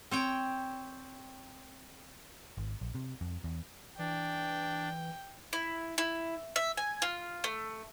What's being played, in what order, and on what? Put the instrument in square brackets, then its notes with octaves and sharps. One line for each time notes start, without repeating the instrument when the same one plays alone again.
[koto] C4 C#5 G5
[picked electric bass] G#1
A#1
C3
F2
E2
[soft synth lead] E3 [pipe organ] D4 [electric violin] G5
[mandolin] E4
E4
E5
G#5
F4
A3